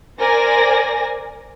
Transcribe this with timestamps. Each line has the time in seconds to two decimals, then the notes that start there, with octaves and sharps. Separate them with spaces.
0.21 A#4 C5 D5 G#5 A#6